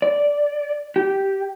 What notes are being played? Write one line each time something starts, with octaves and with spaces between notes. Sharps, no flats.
D5
G4